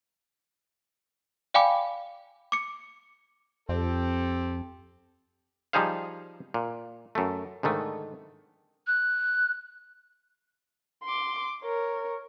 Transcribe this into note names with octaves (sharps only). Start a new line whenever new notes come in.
D5 F5 G5 G#5 B5 D6
D6 C#7
F2 C4 G4 A4
F3 G3 D#4 G#4 C5 F5
A#2
F#2 A3
G#2 D3 D#3 A3
F#6
C6 D6
A#4 C#5